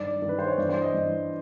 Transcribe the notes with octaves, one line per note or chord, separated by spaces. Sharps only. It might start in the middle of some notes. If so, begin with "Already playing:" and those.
Already playing: G2 D#3 D5
G2 D#3
B4
C5
C#5
G2 E3 D5
C5
D#5
G2 E3